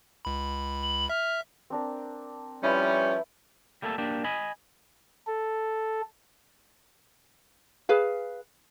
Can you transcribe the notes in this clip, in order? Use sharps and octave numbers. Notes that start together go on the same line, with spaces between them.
C#2 B5
F#7
E5 F6
C4 D4 A#4
F3 G3 C#4 E4 B4
G3 A3 A#3 G4 A4
A#3 D4 G4
D#5 G#5 B5
A4
G#4 B4 F5